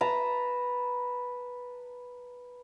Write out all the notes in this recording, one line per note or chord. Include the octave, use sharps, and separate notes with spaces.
B4 A5 A#5